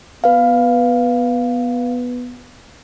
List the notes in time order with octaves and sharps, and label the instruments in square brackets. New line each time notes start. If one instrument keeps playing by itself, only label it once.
[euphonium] B3 [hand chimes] B4 F5